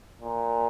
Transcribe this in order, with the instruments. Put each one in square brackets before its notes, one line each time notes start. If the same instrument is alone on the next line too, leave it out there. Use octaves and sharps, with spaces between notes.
[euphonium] A#2